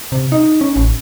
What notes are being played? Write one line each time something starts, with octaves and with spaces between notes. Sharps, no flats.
C3
D#4
C#4
A1